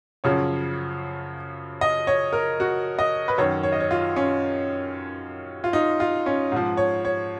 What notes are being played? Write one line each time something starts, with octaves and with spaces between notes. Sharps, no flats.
F#2 C#3 F3 C#5
D#5
C#5
A#4
F#4
D#5
B4
F#2 D#3 C#5
C#5
D#5
C#5
F4
C#4
F4
D#4
F4
C#4
G#2 F3
C#5
C#5